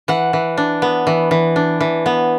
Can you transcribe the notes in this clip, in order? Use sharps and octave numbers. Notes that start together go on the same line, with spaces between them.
E3 F#5
E3
D4
B3
E3
E3
D4
E3
B3